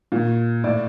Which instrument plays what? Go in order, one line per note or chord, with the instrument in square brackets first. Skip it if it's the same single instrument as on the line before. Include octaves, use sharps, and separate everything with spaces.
[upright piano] A#2
A2 D5